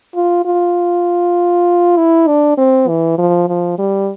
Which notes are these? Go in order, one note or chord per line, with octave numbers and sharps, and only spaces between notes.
F4
F4
E4
D4
C4
E3
F3
F3
G3